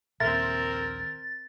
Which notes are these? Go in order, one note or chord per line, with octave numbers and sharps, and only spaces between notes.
A#1 D#2 C4 A#4 E5 A6